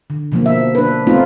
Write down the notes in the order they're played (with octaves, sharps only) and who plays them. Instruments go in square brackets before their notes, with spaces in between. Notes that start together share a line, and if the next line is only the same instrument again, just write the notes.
[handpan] D3
B2 F3 A#3
E5
D4 B4
A3 B3 C4 D#4 F4